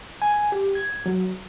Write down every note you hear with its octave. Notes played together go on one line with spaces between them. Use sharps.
G#5
G4
G#6
F#3